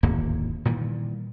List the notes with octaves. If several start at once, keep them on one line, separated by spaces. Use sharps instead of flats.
D1 G#1 D#2 A#3
A#2 D#3 E3 G3